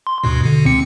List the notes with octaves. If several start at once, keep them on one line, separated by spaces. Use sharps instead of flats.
C6
D2 G2 B2
B2 D3
C#2 C4 C#7